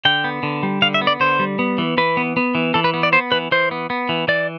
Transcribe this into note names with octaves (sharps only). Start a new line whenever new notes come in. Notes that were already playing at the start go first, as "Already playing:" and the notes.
D3 G5
B3
D3
G3
D3 F5
E5
B3
D5
D3 C5
G3
B3
E3
E3 B4
B3
B3
E3
E3 A4
B4
B3
D5
B3 C5
E3 B4
E3 C5
B3
B3
E3
E3 D5